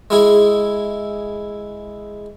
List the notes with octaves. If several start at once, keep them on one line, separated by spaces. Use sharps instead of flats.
G#3 E4 G#4